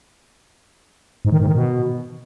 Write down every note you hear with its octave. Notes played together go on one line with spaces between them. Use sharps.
G#2
D#3
G#2
D#3
B2